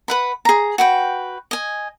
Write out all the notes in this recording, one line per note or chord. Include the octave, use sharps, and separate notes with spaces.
B4 F#5 B5
G#4 A#5
F#4 B4 G5
D#5 G#5